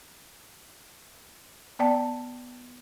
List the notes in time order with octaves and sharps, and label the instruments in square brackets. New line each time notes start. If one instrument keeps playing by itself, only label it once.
[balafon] B3 D5 G5 A5